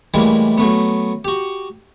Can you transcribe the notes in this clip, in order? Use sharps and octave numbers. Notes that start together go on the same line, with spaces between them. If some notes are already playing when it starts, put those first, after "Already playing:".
A2 E3 G3 G#3 A#3
F#3 A3 B3
F#4 G4